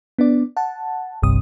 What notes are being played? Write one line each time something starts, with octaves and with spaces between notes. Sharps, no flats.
B3 D4 D5
F#5 A5
G1 C2 G2 C3 D#6